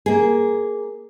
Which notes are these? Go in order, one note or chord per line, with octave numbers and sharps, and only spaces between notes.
A#3 G#4